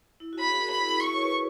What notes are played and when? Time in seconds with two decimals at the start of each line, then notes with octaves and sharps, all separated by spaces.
0.20 E4
0.33 F#4
0.39 B5
0.47 G#4
0.60 F#4 A#4
0.71 B5
0.80 E4 G#4
1.00 E4 G#4 C#6
1.13 C#5
1.21 G#4 B4